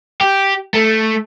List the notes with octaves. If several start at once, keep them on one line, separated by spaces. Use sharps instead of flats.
G4
A3